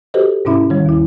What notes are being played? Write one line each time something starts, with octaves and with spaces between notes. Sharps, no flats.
F#4 G4 A4 B4 C5 D#5
G#2 C3 C#4 E4 E5 B5
D#3 G3
D#2 E4